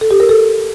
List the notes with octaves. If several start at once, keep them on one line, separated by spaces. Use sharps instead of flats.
A4
G4
A#4
A4